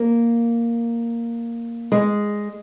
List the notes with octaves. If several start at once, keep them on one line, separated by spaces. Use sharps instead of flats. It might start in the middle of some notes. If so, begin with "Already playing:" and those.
Already playing: A#3
G#3